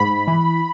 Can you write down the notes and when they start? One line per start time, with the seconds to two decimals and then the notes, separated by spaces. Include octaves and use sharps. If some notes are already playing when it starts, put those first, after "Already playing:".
Already playing: G#2 B5
0.27 E3